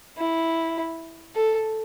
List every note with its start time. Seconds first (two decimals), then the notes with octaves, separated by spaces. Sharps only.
0.18 E4
1.35 A4